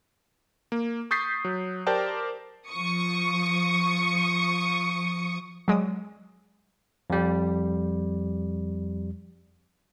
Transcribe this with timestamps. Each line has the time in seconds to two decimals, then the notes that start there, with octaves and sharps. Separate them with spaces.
0.72 A#3
1.11 C#6 D#6 G6 A6 B6 C7
1.45 F#3
1.87 G4 A#4 C5 D5 G5 A5
2.68 F3 C#6 D#6 C#7
5.68 F#3 G#3 D5 D#6
7.10 F2 G3